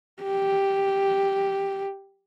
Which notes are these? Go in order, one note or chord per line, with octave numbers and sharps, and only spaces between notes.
G4